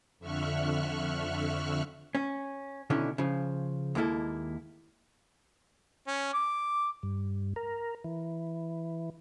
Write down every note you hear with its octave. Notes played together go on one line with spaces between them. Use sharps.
F2 D3 E5 C#6 F6 F#6
C#4
B2 D3 D#3 C#4 E4
C#3 F3
D#2 G#3 A#3 E4 A4
C#4
D6
G2
A#4
E3